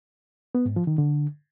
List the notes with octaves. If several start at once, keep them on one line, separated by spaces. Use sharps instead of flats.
B3
G#2
F3
D#3
D3